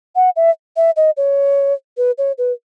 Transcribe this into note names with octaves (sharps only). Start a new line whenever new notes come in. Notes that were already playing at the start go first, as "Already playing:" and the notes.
F#5
E5
E5
D#5
C#5
B4
C#5
B4